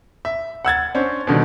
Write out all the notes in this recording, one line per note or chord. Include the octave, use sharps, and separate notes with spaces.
E5
F#5 E6 G#6 A6
C#4 D4 C5
B2 D3 D#3 G3